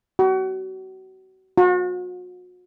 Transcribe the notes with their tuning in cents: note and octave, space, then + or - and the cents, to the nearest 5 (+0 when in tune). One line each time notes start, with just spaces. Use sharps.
F#4 +35
F#4 -40